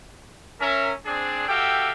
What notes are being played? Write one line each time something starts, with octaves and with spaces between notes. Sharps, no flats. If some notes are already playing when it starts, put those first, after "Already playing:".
C#4 A#4 E5
C4 D4 G#4
F#4 G4 A4 E5 F5 G5